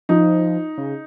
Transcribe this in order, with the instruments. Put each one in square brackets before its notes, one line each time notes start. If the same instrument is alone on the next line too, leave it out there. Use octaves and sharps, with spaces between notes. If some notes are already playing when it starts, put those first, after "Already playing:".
[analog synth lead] F3 [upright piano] D#4
[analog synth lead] C#3